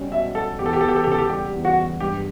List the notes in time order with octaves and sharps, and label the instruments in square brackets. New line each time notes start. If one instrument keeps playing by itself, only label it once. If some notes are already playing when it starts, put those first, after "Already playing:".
Already playing: [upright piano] B2 G3 C#4
[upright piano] B2 [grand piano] E5
[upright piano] F#4 [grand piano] A4
[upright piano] E2 [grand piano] G4
[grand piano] A4
G4
[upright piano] E2 [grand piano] A4
[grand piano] G4
A4
[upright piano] C#3 [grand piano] G4
[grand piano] A4
G4
[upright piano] G3 [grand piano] G4
[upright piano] E2
[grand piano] F#4
[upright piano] E2
[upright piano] G2 [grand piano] G4